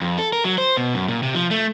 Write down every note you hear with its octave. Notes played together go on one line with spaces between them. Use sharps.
F2
A4
A#4
F#3
C5
B2
F#2
A#2
C3
F3
A3